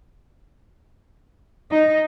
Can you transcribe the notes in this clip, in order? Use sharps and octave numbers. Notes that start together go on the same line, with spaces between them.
D#4